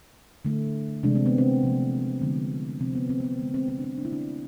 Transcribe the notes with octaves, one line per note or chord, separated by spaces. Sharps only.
D3 A3
C3 E3 G#3 D4
C4
B3
C4
C3 F3 A3
D3 F3 G#3 B3
C3 F3 G#3 C4
B3
C4
B3
C4
D3 G#3 B3
C4
C4
D4
C4
D3 A3 D4 E4
D4